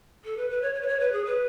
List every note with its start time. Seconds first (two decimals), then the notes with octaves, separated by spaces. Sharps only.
0.24 A4
0.37 B4
0.50 B4
0.62 C#5
0.74 C#5
0.81 B4
0.88 C#5
1.00 B4
1.12 G#4
1.25 B4